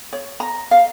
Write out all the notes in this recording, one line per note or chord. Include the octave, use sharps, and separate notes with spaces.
C#5
A#5
F5